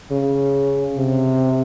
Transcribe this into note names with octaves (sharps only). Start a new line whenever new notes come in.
C#3
C3